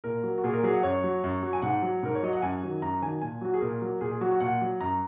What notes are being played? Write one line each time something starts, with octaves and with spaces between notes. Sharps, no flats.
A#2 A#4
F#3
F#4
A#2 G#4
A#4
F#3 G#4
F#5
F#2 C#5
F#3
F#2
F#3
G#5
G#2 F#5
F#3
G#2 A#4
C#5
F#3 D#5
F#5
F#2 G#5
D#3 F#3
F#2 A#5
D#3 F#3 G#5
A#2 G#5
F#3 F#4
G#4
A#2 A#4
F#3
A#2 G#4
G#4
F#3 F#4
F#4
A#2 F#5
F#3
F#2 A#5